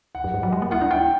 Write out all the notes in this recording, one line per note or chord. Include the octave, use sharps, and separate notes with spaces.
F#5
F#2
G2
F#3
G3
A#3
E4 F#5
D4
E4 G5